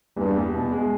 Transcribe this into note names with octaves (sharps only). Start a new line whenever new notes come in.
E2 G2
E2
B2
G#3